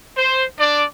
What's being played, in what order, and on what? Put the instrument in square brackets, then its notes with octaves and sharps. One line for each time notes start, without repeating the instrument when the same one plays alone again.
[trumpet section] C5
D4 D5